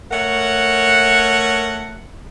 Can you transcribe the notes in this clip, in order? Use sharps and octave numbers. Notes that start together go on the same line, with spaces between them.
A3 A#4 C#5 F#5